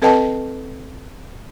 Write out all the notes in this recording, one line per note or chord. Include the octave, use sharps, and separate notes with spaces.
C4 A4 B4 D#5 G5 A5